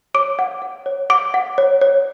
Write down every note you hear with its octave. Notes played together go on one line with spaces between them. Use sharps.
C#5 D6 D7
F#5
F#5
C#5
F#5 D6 D7
F#5
C#5
C#5